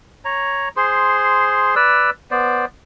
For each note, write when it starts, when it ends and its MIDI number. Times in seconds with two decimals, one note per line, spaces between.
0.25 0.69 73
0.25 0.69 82
0.77 1.75 68
0.77 1.75 72
0.77 1.75 84
1.76 2.10 71
1.76 2.10 74
1.76 2.10 88
2.31 2.65 59
2.31 2.65 72
2.31 2.65 74